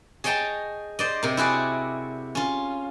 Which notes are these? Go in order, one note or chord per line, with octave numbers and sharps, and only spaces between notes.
G#4 C#5 D#5 G5 A5 A#5
C5 D5 D#5
C3 A#4
E4 F#4 G#4 D5
C#4 F4